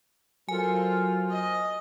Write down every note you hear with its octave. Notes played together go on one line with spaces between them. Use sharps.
F#3 F4 A4 A#4 C5 G#5
D#5